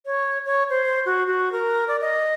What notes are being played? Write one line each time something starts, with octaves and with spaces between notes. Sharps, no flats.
C#5
C#5
C5
F#4
F#4
A#4
D5
D#5